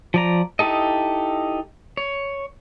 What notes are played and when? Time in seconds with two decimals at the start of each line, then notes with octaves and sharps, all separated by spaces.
0.14 F3 D5 A#5
0.59 D#4 E4 G4 A4 D#5
1.97 C#5